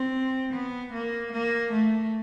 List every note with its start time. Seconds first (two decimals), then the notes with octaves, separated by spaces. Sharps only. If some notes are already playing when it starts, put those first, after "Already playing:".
Already playing: C4
0.53 B3
0.93 A#3
1.32 A#3
1.72 A3